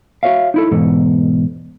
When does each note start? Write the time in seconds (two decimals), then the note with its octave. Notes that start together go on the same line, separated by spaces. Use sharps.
0.23 F#4 G#4 C#5 E5 F5
0.54 D#4 E4 A4
0.71 E2 G#2 B2 A4